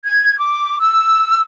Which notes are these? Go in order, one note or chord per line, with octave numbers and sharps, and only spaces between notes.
G#6
D6
E6